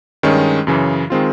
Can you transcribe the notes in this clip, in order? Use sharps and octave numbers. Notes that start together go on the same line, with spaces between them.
G2 D#3 G#3 C#4
F#2 C#3 E3
D#3 G#3 C4 F4